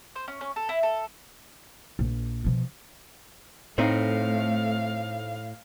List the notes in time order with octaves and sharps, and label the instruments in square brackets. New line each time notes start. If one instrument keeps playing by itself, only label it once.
[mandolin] C5
C#4
C#4
A4
E4
A4
[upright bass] A#1
B2 F3
[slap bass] A2 [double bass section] A3 [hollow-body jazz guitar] C4 D#4 [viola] F5